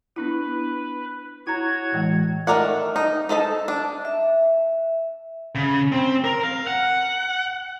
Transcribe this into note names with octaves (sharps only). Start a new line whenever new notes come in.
B3 D4 E4 B4
E4 F#4 C#5 A#5 G#6
A2 E3 G#3
D#3 A3 A#4 D5 F#5
D#4
D#4 A4 D#5 E5 A5
D4
E5
C#3
C4
A#4
F5
F#5